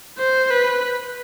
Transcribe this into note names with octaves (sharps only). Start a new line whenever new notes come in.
C5
B4